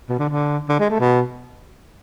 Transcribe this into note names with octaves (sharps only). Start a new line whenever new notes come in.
B2
D3
D3
D3
G#3
A3
B2